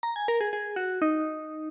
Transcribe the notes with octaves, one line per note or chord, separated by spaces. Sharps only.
A#5
G#5
A#4
G#4
G#4
F#4
D#4